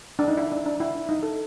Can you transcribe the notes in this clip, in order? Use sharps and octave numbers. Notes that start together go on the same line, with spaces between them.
D4
D#4
E4
D4
D4
E4
D4
D#4
A4